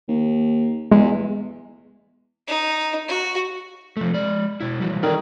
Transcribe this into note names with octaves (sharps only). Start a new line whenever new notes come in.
D#2
E2 G#3
D#4
F#4
F3 A3
G#3 D5
B2 E4
E3 F#3 G3
D#3 A4 A#4 D5